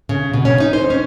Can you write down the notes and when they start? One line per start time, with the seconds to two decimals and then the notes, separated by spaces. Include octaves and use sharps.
0.09 C#3
0.34 B2
0.45 C#4
0.60 D#4
0.73 C5
0.90 C#4